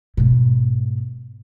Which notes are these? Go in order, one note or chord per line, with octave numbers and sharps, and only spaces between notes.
G#2 B2